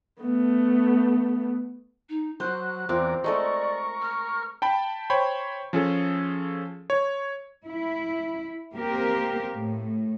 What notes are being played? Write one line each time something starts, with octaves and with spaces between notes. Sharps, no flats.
A3 B3
D#4
F#3 C5 F#6
E2 C4 F4 A#4 D5
G#3 A3 A4 A#4 D5 C#6
F6
G5 A5 B5
C5 C#5 G5 B5
F3 C#4 G#4 A4
C#5
E4
A#3 C4 G4 A#4
A2